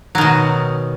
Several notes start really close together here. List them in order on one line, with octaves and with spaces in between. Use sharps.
F#3 D#3 B2